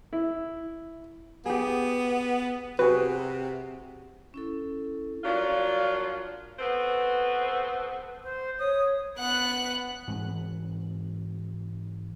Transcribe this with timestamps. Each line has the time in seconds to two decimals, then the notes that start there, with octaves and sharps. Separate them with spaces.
0.13 E4
1.46 B3 G4 G#4
2.79 C3 F#4 G#4 B4
4.34 C#4 E4 A4
5.24 F3 F#3 A#3 D4 F4
6.59 B3 C4 F#4 A4 B4 C5
8.23 C5
8.59 C#5 D#6
9.18 B3 F#5 F#6
10.08 G#2 E3 G#3 C4